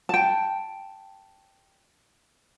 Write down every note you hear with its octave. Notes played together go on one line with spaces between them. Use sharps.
G5 A5